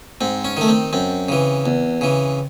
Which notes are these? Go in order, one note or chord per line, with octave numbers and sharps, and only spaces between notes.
G#2 C4
C#4
D#3 A3
C4
F#2 C4
C#3 E3
E2
C#3 E3